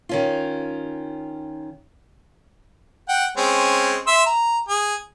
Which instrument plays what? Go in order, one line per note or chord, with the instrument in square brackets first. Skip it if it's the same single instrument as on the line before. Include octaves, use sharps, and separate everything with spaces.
[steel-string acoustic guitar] D#3 C#4 F4
[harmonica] F#5 G5
G#3 C4 C#4
E5 C6 E6
A#5
G#4